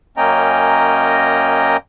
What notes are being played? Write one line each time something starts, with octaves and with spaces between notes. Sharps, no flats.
F#2 A#3 C#4 D#5 G5 A#5